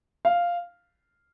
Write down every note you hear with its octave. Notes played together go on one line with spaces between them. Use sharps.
F5